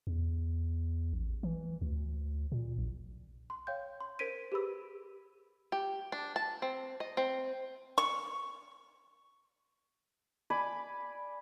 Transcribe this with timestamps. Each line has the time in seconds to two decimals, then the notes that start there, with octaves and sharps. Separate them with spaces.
0.07 E2
1.13 A1
1.43 E3
1.81 D2
2.52 A#2
2.78 A#1
3.50 C6
3.67 C#5 F5 G5 G6
4.01 C6
4.19 A#4 C5 G#6 B6 D7 D#7
4.52 G4 G#4 B4 B5 E6
5.72 G4
6.12 D4
6.36 A5
6.62 C4
7.00 D#5
7.17 C4
7.98 C#6
10.50 D5 G#5 B5 D6